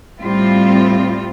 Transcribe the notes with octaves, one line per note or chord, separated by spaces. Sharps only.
A2 G3 C4 F4